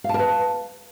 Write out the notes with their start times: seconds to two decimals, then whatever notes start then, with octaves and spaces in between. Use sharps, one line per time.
0.04 F5
0.09 A5
0.14 A#4
0.19 B4